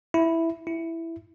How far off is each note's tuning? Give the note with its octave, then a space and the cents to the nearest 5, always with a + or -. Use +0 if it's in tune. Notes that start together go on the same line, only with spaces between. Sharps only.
E4 +0
E4 +5